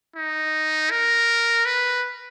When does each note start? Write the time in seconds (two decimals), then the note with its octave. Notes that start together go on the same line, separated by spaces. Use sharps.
0.15 D#4
0.91 A#4
1.65 B4